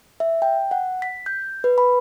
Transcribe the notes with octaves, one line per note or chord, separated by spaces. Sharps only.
E5
G5
F#5
B6
G6
B4
B5